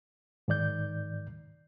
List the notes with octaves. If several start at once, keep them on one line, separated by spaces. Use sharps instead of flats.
G#2 D#3 D5 G6